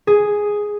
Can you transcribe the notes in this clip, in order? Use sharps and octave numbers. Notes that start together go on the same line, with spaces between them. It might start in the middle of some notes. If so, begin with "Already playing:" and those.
G#4